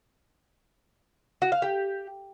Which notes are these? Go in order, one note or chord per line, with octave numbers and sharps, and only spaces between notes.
F#4
F5
G4